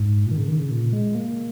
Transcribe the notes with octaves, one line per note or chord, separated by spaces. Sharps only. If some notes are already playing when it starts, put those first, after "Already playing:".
Already playing: G#2
A#2
D#3
C#3
D#3
C#3
A#2
G#3
A#3